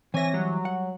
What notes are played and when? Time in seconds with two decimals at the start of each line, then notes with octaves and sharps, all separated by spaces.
0.14 E3 C4 C#5 E5 G#5 A#6
0.34 F#3 G3
0.65 F#5